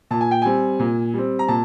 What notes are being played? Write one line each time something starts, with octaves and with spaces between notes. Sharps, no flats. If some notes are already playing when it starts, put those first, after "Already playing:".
A#2 A5
G#5
G5
G3 C4 G#5
A#2
G3 C4
A#5
A#2 A5